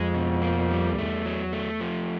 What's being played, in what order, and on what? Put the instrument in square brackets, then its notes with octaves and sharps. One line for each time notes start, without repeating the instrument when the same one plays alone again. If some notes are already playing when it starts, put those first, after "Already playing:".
Already playing: [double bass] F2 [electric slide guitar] G#3
[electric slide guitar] B2
A#3
G3
[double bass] E2 [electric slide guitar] A3
[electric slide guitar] F#3
A3
F3